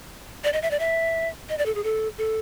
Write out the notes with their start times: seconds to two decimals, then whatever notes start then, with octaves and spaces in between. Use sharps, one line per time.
0.44 D5
0.53 D#5
0.62 E5
0.71 D5
0.80 E5
1.49 D#5
1.58 D5
1.66 A4
1.75 G#4
1.84 A4
2.18 A4